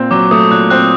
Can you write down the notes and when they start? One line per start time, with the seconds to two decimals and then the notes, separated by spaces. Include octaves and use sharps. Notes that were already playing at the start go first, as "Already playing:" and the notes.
Already playing: A#2 C4
0.11 F#3 D6
0.31 A3 D#6
0.51 A#2 F#6
0.70 C4 F#6